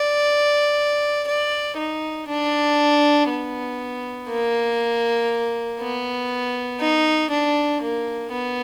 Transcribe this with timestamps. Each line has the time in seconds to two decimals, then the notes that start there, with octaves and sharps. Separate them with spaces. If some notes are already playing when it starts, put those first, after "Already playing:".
Already playing: D5
1.27 D5
1.77 D#4
2.28 D4
3.29 B3
4.29 A#3
5.80 B3
6.81 D#4
7.31 D4
7.82 A#3
8.32 B3